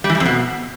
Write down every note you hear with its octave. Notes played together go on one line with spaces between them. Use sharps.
G3
E3
G#2
F2
B2